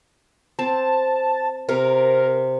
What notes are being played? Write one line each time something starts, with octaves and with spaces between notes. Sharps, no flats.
C4 A5
C3 A#4